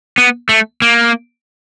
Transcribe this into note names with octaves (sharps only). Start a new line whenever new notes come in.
B3
A3
A#3